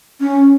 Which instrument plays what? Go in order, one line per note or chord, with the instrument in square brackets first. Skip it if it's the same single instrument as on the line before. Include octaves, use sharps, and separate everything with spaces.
[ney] C#4